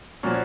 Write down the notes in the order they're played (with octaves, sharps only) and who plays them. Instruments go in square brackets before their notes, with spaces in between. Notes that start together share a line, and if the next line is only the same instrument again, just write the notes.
[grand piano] A#2 F3 A#3 C#4 F#4